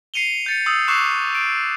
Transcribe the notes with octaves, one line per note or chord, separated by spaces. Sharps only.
C7 C#7 D#7 F7 G7
G6 A6 C#7
D#6 E6 G6
C#6 D6 E6 F#6 C7 E7
D7